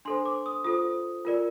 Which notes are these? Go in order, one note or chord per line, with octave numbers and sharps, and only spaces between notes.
D4 A4 C5 C6
D6
D#6
F4 A4 C5 D#6
F4 A#4 D5